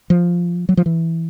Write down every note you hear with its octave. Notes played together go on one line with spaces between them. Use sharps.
F3
F#3
F3
E3